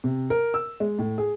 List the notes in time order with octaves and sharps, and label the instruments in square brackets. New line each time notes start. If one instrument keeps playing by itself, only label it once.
[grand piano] C3
A#4
E6
G#3
A2
G#4